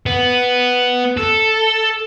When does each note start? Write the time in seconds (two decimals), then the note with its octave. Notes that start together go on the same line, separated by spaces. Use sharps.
0.06 B3
1.17 A4